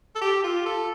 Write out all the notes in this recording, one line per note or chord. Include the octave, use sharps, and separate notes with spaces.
A4
G4
F4
A4